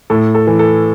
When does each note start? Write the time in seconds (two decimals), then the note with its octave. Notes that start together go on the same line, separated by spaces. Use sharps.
0.10 A2 A4
0.35 A4
0.47 E3
0.59 A4